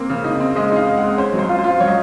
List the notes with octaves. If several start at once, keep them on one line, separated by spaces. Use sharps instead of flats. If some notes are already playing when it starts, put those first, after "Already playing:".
Already playing: A#3 C4
C#3
D#4
C4
G#3 D#5
D#4 F5
G#3
F#5
C4
C#4 C5
F#3
C5
F4
C5
F4
F#3 C#5
D#5